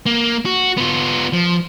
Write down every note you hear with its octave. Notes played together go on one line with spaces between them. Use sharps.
A#3
F#4
B3 F4
F3